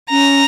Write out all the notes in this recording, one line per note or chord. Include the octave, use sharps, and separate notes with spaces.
C#4 A#5